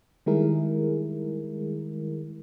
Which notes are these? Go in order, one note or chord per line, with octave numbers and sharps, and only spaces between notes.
D#3 G3 G#3 E4 G#4 A#4